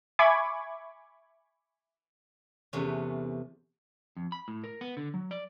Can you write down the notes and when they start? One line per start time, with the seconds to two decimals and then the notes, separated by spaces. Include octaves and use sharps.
0.19 E5 G#5 B5 C#6 D6 G#6
2.73 E2 C3 A3 B3 C#4
4.17 F2
4.32 B5
4.48 A2
4.64 A#4
4.81 B3
4.97 D3
5.14 F#3
5.31 D5